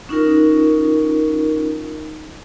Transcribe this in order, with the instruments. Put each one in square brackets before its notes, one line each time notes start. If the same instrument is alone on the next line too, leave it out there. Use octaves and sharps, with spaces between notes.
[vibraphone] C#4 D#4 F4 A#4